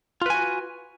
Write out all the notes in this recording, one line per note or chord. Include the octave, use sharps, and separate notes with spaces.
F4 F#4 B4 G#5